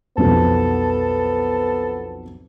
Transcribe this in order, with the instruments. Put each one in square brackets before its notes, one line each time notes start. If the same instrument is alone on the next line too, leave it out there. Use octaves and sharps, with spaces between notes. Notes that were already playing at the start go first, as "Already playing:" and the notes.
[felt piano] B1 F2 B2 [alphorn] B3 [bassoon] A4